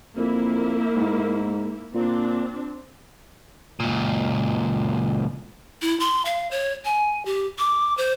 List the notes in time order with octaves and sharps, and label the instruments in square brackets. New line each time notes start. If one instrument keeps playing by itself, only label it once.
[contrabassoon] F2 [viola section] A#3 E4
[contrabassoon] G#2
[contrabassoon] A#2 [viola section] C4 D4
[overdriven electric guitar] C#2 A#2
[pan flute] E4
C6
F5
C#5
G#5
G4
D6
C5